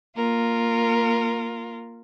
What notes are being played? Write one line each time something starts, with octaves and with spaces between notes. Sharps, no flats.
A#3 F4 A#4